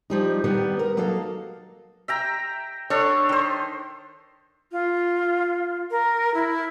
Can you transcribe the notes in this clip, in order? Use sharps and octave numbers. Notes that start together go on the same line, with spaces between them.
F3 G3 D#4
D#3 G3 B3
A#4
F#3 A#3 D#4 A4 F5
E5 G5 A#5
D4 A4 C#5
D#3 C5
F4
A#4
E4